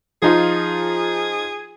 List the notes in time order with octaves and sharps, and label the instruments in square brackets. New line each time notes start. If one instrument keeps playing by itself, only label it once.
[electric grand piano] F3 D#4 F4 [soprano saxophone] G#4